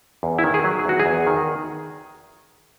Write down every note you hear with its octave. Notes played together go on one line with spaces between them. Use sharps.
E2
E4
D#3
G#4
F#3
G#4
E2 F#4
G#4
E2
D#3